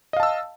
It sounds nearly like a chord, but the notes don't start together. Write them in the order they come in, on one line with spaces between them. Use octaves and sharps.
D#5 F5 A5 E6